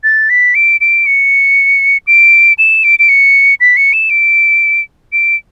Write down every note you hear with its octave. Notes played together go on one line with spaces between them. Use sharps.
A6
B6
D7
D7
C#7
D7
E7
D7
D7
C#7
B6
C#7
E7
D7
D7